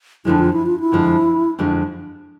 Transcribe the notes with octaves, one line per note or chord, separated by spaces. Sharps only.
F2 D3 F3 G#3 E4
F4
E4
F4
E4
F2 D3 F3 G#3
F2 D3 F3 G#3